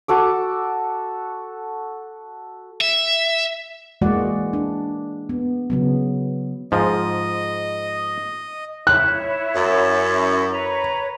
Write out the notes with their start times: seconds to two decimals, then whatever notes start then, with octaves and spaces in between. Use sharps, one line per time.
0.08 F#4 A4 D6
2.81 E5
4.01 E3 G#3 A#3 F#4 D5 F#5
4.53 D4
5.29 B3
5.70 C#3 F#3 B3
6.72 G#2 F3 D#5
8.87 E4 C#5 F#6
9.55 F#2
10.51 B4 C#5 A#5